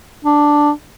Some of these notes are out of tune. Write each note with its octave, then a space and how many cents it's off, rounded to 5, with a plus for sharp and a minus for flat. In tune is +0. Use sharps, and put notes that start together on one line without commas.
D4 +0